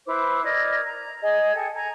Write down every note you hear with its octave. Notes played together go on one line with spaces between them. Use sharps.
E4 B4 C5 D6
A#4 D5 D#5 G#6
A#5
G#4 D#5
G#4 A4 G5
G#5 A#5